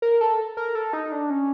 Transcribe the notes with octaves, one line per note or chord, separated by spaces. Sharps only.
A#4
A4
A#4
A4
D#4
D4
C#4